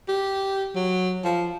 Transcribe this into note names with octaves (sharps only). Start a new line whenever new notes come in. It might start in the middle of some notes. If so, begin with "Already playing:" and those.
G4
F#3
F3